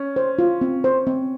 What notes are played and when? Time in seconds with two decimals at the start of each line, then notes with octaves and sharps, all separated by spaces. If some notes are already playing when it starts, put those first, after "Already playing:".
Already playing: C#4
0.16 C5
0.39 F4
0.61 C4
0.84 C5
1.07 C4